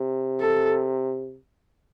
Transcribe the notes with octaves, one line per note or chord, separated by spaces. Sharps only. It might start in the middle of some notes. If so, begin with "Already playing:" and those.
Already playing: C3
A4